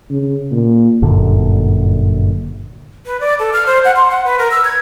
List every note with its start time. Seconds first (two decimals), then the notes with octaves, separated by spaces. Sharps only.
0.10 C#3
0.51 A#2
1.02 G1 F#2 A#2 D3
3.06 B4
3.20 D5
3.39 A4
3.53 F6
3.66 C5
3.85 F#5
3.96 C6
4.10 F#5
4.25 B4
4.39 A#4
4.51 E6
4.65 G#6